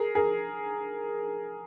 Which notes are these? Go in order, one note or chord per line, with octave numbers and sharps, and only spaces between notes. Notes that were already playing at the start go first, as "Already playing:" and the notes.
Already playing: G#4 A#4
G#4 A#4